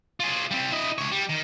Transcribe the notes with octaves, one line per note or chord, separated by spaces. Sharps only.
F4 G#4
G3 C4
E4 D#5
C#2 C#5
G3
D#3